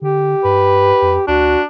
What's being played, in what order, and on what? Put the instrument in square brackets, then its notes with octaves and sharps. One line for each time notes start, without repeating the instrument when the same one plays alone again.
[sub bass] D3 [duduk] G4
[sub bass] G2 [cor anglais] B4
[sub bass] F2
[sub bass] D2 [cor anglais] D4 [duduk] F#4